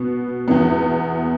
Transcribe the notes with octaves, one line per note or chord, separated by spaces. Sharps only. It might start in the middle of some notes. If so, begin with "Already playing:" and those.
Already playing: B2 B3
E2 E3 B3